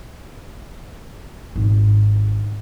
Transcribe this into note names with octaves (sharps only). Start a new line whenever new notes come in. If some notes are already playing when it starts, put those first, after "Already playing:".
G#1